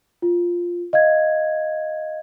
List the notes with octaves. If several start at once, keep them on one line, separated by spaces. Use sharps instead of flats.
F4
D#5 F5 G#6